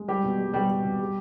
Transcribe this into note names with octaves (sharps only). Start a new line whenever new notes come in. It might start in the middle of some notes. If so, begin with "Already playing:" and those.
Already playing: G#3
G3 G4
B2
G3
B2 G3 G4
G3
B2
G3